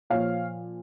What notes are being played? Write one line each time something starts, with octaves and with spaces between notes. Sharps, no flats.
A#2 F3 C#5 F5